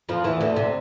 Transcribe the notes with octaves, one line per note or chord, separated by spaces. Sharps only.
F2 F3
E2 E3
D2 D3
C3